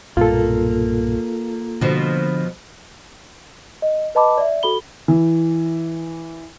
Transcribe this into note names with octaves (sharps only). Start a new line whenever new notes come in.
B1 G2 A#2 A#3 F4 A4
B2 D3 F3
D#5
B4 D#5 A5 B5 D6
D5 E5
F#4 A4 B5 G7
E3